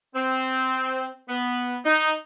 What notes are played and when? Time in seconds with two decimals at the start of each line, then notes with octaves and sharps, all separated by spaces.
0.15 C4
1.28 B3
1.85 D#4